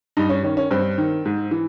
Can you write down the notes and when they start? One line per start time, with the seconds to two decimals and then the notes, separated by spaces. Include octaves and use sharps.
0.17 G2 D#4
0.30 C#4
0.43 D#3 C#4
0.57 C#4
0.71 G2 C4
0.98 D#3
1.25 G#2
1.51 E3